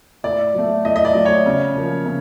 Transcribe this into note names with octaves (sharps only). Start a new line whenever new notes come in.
A2 D5
F#3 A3
A2 D#5
D#5
D5
F#3 A3
C#5
C#3
F3 A#3 C#4
C#3